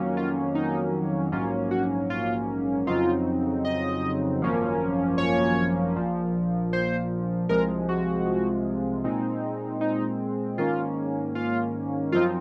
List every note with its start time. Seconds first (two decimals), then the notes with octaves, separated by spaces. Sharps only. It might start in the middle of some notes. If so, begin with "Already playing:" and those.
Already playing: F2 D#3 F#3 A#3 C#4
0.17 F4
0.55 D#4
1.32 A#1 G#2 F#3 A#3 C#4 F4
1.71 F#4
2.10 F4
2.87 F2 C#3 F#3 C4 D#4 F4
3.65 D#5
4.42 G#1 F#2 F3 A#3 C#4
5.18 C#5
5.96 A#1 A#2 F3
6.73 C5
7.49 C2 C3 F3 G#3 A#4
7.89 F#4
9.04 A#2 G#3 C4 D#4
9.81 D#4
10.58 G#2 D#3 A#3 C#4 F4
11.35 F4
12.12 F#2 F3 C4 D#4 F4